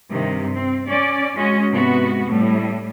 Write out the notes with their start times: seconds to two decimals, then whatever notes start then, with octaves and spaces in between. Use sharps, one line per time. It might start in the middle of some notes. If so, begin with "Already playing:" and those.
0.10 G2 C3 D#3
0.55 C4
0.88 C#4 D5
1.36 G#3 C#4 F#4 D#5
1.71 G#2 C3 G#3 B3 F#4
2.26 A2 G3